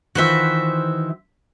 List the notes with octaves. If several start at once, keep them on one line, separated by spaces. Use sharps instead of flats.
D#3 E3 F4 F#4 C5 E5